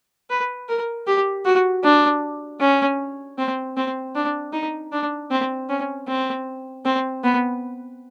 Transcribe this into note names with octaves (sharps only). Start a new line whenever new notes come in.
B4
A#4
G4
F#4
D4
C#4
C4
C4
D4
D#4
D4
C4
C#4
C4
C4
B3